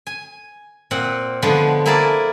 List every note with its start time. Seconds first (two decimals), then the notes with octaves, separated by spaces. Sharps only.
0.07 G#5
0.91 A#2 C4 F#5
1.42 D3 F3 G#3 B3 D4
1.86 A#3 E4 G#4 A#4 D5 A5